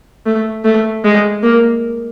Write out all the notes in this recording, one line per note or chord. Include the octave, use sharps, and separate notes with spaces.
A3
A3
G#3
A#3